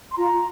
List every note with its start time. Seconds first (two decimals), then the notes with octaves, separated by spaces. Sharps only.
0.11 C6
0.17 F4 A#5